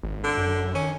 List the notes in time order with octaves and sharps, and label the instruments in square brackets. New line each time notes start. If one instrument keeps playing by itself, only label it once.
[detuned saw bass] G#1
[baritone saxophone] D3
[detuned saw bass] F#2
[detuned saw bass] D#3 [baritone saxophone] C#4